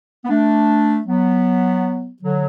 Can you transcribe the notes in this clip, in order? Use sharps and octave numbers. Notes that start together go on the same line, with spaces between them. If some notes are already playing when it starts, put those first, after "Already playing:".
B3
A3 D4
F#3 B3
D3 F#3